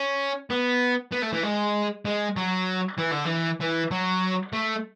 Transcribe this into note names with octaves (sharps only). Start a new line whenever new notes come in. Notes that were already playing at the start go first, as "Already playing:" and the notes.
Already playing: C#4
B3
B3
A3
E3
G#3
G#3
F#3
E3
D3
E3
E3
F#3
A3